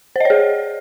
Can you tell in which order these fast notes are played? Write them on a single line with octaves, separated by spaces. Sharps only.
C5 D#5 C#5 G#4